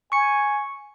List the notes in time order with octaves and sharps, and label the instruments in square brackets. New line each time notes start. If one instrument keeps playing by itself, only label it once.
[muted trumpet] G#5 [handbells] C#6 C#7